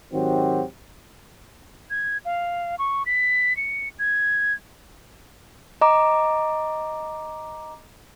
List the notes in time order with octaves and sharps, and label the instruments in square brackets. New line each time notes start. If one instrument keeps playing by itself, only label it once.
[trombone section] G#2 D#3 F#3 C4 F#4 G4
[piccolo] G#6
F5
C#6
B6
C#7
G#6
[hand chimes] D#5 A#5 D6